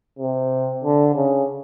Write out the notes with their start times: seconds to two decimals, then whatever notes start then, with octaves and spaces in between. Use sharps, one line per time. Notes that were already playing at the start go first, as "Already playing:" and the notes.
0.19 C3
0.84 D3
1.15 C#3